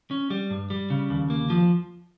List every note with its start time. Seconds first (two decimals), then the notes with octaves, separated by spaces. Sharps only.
0.11 C#4
0.30 G3
0.50 G2
0.70 G3
0.90 C#3
1.10 D#2
1.30 A#3
1.50 F3